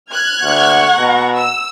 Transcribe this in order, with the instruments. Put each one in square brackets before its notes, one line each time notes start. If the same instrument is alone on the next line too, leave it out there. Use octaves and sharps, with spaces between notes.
[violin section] F6 F#6 G#6
[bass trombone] D2 [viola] F#5 C#6
[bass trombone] B2 [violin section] A#5
[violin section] E6